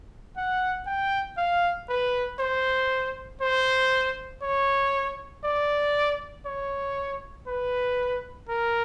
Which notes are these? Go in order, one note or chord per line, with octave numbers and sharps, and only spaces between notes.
F#5
G5
F5
B4
C5
C5
C#5
D5
C#5
B4
A#4